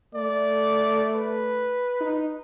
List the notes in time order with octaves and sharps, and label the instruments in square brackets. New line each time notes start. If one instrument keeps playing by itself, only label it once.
[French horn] A3 [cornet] D5
[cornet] B4
[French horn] D#4